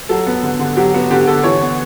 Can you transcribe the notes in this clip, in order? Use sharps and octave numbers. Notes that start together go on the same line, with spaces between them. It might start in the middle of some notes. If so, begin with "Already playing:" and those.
F#3 A4
B3
D3
D3
F#3 G4
B3 F#4
D3 G4
D3 A4
E3 C#5
B3